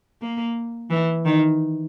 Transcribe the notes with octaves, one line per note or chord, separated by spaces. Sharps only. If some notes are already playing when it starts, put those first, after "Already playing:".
A#3
E3
D#3